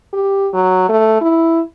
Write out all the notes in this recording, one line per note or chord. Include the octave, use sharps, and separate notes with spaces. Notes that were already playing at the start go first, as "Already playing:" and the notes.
G4
F#3
A3
E4